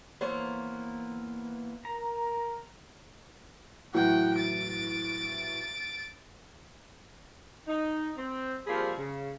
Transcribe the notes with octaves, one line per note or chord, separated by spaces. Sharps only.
E3 A#3 B3 C5 C#5
A#4 A#5
A2 E3 F#3 F#5 G5
A6 D7
D#4
C4
F3 G3 A#3 C4 G#4 B5
C#3